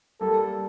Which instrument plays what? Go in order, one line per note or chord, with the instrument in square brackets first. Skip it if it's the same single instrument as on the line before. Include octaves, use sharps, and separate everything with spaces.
[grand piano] G3 A#3 [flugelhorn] A4